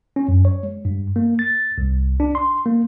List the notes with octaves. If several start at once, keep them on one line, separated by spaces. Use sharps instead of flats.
C#4
F#2
C#5
G#3
G2
A#3
A6
C2
D4
C6
A#3